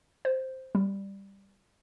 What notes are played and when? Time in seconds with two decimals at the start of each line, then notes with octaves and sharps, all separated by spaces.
0.25 C5
0.75 G3